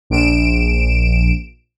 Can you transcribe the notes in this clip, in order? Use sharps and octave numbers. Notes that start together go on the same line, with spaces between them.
A#1 D7 E7